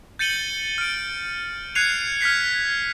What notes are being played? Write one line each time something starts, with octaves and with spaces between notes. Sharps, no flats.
G6 A6 C#7 D#7 F#7 G7
F6 D7
F#6 G#6 C7 C#7 D#7 F7
F6 G#6 B6 C7